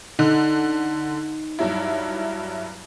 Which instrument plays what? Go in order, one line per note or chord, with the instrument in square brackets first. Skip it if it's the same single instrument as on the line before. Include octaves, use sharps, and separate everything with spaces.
[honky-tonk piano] D3 [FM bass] D#4
[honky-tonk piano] G2 F#3 E4